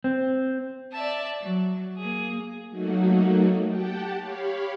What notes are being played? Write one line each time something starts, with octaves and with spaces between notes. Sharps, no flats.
C4
D5 E5 A5
F#3
A#3 G#4
F#3 A3 A#3 D#4 F#4
G4 F#5 G5 A5
G4 C#5 F5 B5